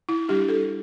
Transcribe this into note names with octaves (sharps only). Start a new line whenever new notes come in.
E4
G3 D4 G4
A4